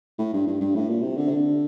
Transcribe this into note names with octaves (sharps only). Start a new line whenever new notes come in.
A2
G2
G2
G2
A2
A#2
C3
D3
C3
D3